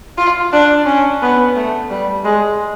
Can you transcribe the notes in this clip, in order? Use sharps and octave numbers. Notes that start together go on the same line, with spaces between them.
F4
D4
C#4
B3
A3
G3
G#3